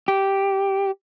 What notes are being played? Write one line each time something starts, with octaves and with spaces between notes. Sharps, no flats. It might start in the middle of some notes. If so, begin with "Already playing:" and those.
G4